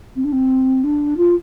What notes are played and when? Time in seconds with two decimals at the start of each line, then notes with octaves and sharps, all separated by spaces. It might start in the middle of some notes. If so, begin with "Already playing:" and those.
0.15 C4
0.24 D4
0.32 C4
0.83 D4
1.17 F4